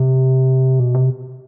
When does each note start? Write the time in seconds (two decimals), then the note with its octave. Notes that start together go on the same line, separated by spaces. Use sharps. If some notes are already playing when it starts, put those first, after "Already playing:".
Already playing: C3
0.80 B2
0.94 C3